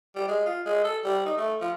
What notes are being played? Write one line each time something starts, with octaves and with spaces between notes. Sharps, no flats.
G3
G#3
F4
G#3
A4
G3
D#4
A3
F3